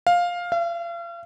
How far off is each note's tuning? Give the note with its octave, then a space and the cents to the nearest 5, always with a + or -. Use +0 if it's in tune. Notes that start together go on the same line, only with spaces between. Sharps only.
F5 +10
F5 -40